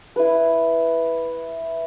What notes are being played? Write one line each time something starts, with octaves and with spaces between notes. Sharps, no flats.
E4 B4